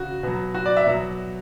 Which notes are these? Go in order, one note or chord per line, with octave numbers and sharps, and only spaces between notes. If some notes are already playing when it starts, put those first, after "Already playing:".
Already playing: C#3 F#4
B2 F#3
F#4
D5
E5
B2 F#3